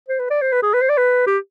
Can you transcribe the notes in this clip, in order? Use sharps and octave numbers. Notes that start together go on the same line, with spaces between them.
C5
B4
D5
C5
B4
G#4
B4
C5
D5
B4
G4